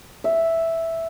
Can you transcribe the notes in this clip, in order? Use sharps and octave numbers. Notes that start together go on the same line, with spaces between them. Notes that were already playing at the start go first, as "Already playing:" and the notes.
E5